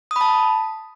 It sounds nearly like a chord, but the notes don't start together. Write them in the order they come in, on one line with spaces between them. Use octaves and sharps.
D#6 B5 A5